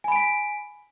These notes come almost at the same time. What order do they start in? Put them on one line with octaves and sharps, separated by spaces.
G#5 B5 D7 B6